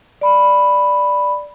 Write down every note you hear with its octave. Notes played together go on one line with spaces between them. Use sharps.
D5 B5